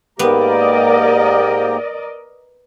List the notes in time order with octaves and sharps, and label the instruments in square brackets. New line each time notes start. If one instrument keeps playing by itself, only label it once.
[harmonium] G#2 A#3 G4 [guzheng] B3 [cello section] A#4 D5 D#5